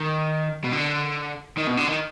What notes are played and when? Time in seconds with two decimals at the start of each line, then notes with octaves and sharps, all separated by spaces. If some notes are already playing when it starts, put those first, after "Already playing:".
Already playing: D#3
0.64 B2
0.73 D3
1.57 D#3
1.67 B2
1.77 D3
1.88 D#3